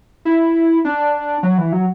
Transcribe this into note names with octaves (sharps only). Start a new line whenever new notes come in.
E4
D4
F#3
E3
F#3